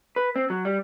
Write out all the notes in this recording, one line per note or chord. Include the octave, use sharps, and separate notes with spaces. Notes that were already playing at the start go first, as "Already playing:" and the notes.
B4
C4
F#3
G3